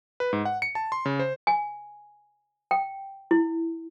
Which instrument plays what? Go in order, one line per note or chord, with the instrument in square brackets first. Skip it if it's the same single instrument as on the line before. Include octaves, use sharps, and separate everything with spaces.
[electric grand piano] B4
G#2
F#5
C#7
A5
C6
C#3
C5
[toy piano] G#5
G5
E4